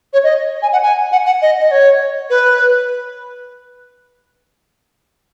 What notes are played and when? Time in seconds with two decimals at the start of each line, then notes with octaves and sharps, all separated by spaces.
0.13 C#5
0.23 D#5
0.62 G#5
0.72 F#5
0.82 G#5
1.11 F#5
1.26 F#5
1.41 D#5
1.59 D#5
1.71 C#5
2.29 B4